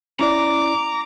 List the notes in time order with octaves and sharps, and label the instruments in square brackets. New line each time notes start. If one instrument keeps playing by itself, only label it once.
[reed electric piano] C#4 E4 D5 [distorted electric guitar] A#5 [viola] D6